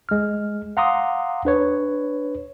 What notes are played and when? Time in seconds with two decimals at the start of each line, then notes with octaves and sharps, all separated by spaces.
0.09 G#3 F6
0.77 F5 F#5 A#5 C6 D6 D#6
1.45 D4 B4 C#5